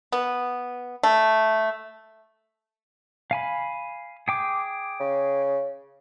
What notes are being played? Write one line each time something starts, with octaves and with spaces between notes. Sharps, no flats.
B3
A3
F5 G#5 B5
G#4 G5 D6
C#3